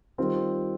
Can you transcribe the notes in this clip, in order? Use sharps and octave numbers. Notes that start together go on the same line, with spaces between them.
D#3 G3 C4 F4